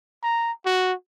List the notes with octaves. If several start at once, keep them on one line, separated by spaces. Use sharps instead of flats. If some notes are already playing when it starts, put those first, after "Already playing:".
A#5
F#4